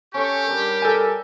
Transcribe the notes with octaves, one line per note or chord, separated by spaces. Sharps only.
C#4 G4 A4 C#6
G3 D4 A#4
A4 D#5 G#5 E6